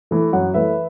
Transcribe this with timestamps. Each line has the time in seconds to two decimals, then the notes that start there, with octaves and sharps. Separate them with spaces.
0.11 E3 A3
0.32 F#2 C#5 F#5
0.54 E3 A3 B4 E5